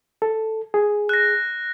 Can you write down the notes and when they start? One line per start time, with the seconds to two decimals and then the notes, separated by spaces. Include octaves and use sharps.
0.22 A4
0.74 G#4
1.09 F#6 A#6